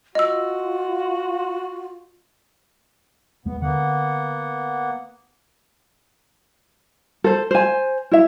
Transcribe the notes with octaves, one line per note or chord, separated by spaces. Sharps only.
F4 F#4 D#5 E6
D#2 G#3 A#3 B3
D3 A#3 B3 F#5
A4 C5
C5 G#5
E4 E5